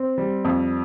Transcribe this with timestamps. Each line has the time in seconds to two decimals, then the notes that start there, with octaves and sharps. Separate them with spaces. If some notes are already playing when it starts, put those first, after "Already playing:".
Already playing: C4
0.18 G3
0.45 F2